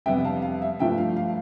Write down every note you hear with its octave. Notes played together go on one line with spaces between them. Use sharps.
F2 C3 G3 B3 D4 E5 G5
F5 A5
F5
E5
G2 F3 A3 D4 E5 G5
F5
F5